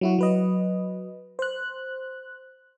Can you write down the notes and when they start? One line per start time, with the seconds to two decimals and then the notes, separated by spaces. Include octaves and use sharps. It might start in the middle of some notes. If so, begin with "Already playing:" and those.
0.01 F#3 E4 F#4
0.19 F#3 B4 D#5
1.39 C5 F#6